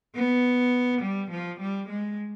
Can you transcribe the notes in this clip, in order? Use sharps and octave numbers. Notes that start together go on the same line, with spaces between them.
B3
G3
F3
G3
G#3